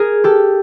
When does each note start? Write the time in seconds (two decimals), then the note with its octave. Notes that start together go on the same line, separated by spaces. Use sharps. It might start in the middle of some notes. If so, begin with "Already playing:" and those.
Already playing: G#4 A#4
0.24 G4 A4